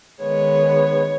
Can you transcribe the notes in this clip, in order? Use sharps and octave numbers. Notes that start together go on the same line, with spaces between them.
D#3 G#3 B3 C#5